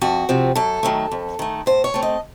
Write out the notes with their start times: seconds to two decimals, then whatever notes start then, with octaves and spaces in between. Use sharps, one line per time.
0.01 F2 F#4
0.29 C3 F3 C4
0.55 F#2 A4
0.83 D#3 F#3 A3
1.12 F2
1.39 D#3 A3
1.66 A2 C5
1.84 C#5
1.94 A3 C4
2.03 D#5